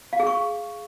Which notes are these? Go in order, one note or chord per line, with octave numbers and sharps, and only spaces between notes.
F5
G#4
C#6